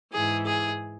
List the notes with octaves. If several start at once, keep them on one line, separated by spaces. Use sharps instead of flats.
G#2 E3 G#4
G#4